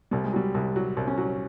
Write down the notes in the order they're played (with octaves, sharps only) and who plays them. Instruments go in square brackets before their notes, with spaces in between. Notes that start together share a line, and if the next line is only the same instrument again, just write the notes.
[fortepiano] C2 [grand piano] G3
[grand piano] G#3
[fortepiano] F#3 [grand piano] G3
[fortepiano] C2
F#3
C2
[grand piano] C#4
[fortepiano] F#3